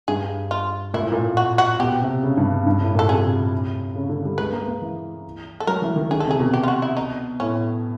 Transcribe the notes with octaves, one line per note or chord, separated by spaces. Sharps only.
G2 G#4
F4
A#2 E4
A2
A#2
F#4
F#4
B2 G4
C3
C#3
G2
G2
A2
A#2 A4
C3 G#4
C#3
D3
G3
G#3 B4
A#3
A#3
E3
A4
F#3 A#4
E3
D#3
D3 G#4
A4
C3
G#4
B2
G4
F4
F#4
E4
D#4
A2 C#4